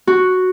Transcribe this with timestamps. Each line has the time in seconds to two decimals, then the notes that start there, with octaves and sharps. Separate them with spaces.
0.07 F#4